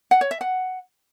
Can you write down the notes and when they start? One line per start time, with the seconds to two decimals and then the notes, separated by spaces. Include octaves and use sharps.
0.11 F#5
0.21 C#5
0.31 E5
0.41 F#5